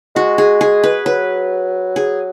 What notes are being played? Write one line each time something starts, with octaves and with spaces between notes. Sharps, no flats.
G#3 F#4
G#4
G#4
B4
F#3 B4
G#4